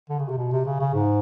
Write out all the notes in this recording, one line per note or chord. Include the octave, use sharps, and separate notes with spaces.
D3
C#3
C3
B2
C3
C#3
C#3
G#2